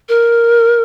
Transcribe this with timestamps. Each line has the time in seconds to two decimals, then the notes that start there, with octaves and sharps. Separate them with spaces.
0.09 A#4